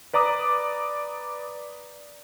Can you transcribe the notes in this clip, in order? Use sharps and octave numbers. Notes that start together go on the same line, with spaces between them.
B4 D5 A#5 D6 D#6